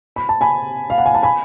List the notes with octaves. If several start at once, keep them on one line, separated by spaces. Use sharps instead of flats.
B5
A5
G#5 B5
F5
F#5
G#5
A5
G#5 B5